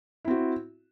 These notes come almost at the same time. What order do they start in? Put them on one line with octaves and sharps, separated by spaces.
E4 C4 F#4